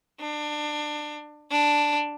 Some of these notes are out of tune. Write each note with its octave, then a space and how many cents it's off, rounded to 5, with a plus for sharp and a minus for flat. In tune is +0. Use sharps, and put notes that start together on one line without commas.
D4 +25
D4 +0